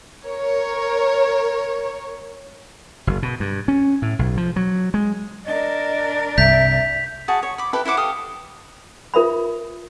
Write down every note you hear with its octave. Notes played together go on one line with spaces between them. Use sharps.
A#4 C#5
F#1
B2
G2
C#4
A2
B1
F3
F#3
G#3
D4 A#4 D#5
C2 G2 E5 G6 B6 F7
F#4 G#4 A5
C#5
B5 D6
E4 G4 A4 B4
E4 C5 F#5 D6
G4 A4 F5 D#6
F4 A#4 E5 B5